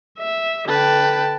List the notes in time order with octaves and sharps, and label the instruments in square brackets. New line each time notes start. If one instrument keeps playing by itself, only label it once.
[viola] E5
[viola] D3 G5 [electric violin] B4 A5